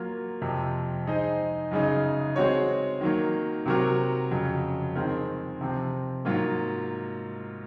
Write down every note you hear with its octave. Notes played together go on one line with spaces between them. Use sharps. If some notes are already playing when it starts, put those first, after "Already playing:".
Already playing: F#3 A#3 F4
F2 C3 F3
G#3 D#4 G#4 C5 D#5
F#2 C#3 G#3 D#4
G#3 C4 F#4 C#5
D#3 F#3 A#3
C3 F#3 C4 F#4 A#4
F2 C#3 F#3
D#3 G#3 C4 F4 A#4
C3 F3 C4
G#2 F#3 A#3 F4